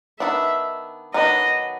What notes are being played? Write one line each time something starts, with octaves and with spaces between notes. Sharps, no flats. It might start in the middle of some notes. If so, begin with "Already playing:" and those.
D#3 F#3 B3 D4 E5
D#3 F#3 B3 D4 D#5